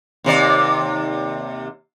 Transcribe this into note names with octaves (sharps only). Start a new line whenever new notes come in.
D#2 C3 D5